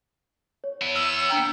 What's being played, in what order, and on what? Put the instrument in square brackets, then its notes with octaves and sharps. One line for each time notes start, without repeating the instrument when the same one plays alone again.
[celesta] C#5
[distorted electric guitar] B3 E4
[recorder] E6 [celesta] F6
[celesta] D4 A#5 F6 [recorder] G5